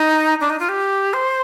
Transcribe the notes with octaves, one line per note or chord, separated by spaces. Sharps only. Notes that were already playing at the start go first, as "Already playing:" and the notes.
Already playing: D#4
D4
D#4
F4
G4
C5